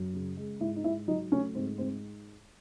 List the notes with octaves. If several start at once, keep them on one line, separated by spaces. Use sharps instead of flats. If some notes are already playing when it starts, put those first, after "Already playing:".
Already playing: F#2
C#3
G#3
G#2 E4
D#4
G#2 E4
F#3 D#4
A3 C#4
G#2 C4
G#2 C4